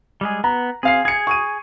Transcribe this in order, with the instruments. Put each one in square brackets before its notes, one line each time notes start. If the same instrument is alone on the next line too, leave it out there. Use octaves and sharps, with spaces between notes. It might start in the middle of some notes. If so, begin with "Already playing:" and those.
[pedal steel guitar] G3 G#3 G#4
[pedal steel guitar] B3 [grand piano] A#5
[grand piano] C4 F5 C7 [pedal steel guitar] G#4
[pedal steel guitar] G#4 [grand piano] G#6 C#7
[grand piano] C#6 D#6 D#7